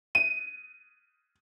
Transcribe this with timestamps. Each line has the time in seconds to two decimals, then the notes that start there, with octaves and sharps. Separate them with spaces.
0.15 D#7